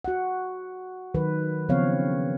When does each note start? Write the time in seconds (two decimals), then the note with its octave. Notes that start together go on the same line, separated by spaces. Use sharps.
0.04 F#4 F#5
1.14 D#3 F#3 B4
1.69 C#3 F3 B3 C4 C#5 F5